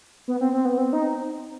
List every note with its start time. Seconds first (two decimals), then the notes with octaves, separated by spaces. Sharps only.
0.28 B3
0.41 C4
0.53 C4
0.65 B3
0.78 C4
0.93 D#4